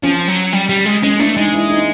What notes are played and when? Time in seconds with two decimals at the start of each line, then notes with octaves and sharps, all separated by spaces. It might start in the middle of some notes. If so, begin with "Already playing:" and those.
0.03 F3 C#4
0.28 F#3
0.53 G3
0.69 G3
0.86 G#3
1.03 G#3 C#4
1.19 A3 D4
1.36 G#3 D#4
1.54 E4
1.70 D#4